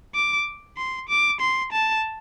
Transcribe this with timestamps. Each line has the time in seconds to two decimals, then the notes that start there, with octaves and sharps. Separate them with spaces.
0.15 D6
0.77 C6
1.09 D6
1.40 C6
1.72 A5